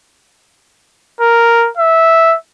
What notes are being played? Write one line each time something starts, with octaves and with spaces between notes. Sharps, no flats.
A#4
E5